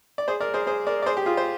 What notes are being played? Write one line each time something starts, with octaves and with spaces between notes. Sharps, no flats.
D5
G#4 C5
A#4 D5
G#4 C5
G#4 C5
A#4 D5
D5
G#4 C5
G4
F4 G#4
C5